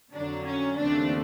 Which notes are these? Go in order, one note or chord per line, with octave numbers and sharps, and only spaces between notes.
F2 D3 F#3 D4
C#4
D#2 C#3 F3 A3 C4 D4